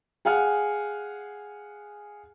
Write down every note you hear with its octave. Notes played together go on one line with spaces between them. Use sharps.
G#4 F5 F#5 G#5 F6